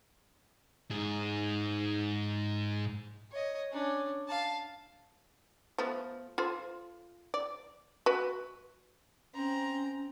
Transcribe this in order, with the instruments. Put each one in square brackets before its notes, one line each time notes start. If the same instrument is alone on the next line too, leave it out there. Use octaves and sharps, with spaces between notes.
[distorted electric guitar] G#2 G#4
[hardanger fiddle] C#5 D#5
C#4 D4
F5 A5
[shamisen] F3 A3 B3
F4 A4 C5
D5
F#4 B4
[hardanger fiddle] C4 A#5 [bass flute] C#4